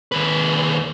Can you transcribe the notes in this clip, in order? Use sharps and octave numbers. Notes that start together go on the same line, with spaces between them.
D#2 B4